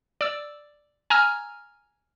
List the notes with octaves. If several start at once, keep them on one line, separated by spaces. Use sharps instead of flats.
D5 E6
G#5 A#5 E6 F6